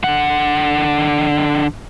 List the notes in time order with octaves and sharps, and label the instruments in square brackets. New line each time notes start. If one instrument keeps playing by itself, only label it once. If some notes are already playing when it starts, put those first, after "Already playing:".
[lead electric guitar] D3 F#5